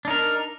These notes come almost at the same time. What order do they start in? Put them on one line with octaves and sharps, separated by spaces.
D4 D#4 A#4